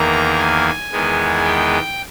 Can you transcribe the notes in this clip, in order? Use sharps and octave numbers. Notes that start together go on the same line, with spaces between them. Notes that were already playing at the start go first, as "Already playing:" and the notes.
Already playing: E2 D#3 A#3 A#5
G#5
E2 D#3 G#3 B3
G5